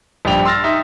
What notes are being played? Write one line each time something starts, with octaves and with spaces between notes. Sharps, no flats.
A#1 G2 G3 G5 F7
C6 E6 F6 A6 A#6
D#4 E5